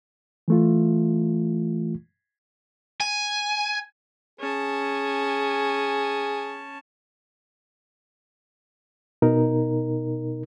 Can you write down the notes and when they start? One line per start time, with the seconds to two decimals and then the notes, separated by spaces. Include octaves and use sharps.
0.48 E3 A3 F4
3.00 G#5
4.39 C#4 G#4 A5
9.22 B2 D#4 A#4